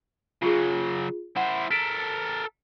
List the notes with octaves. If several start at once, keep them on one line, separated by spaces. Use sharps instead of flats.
C#3 F#3 F4 G#4
E4 C5 F#5
A4 A#4 B6 D7 E7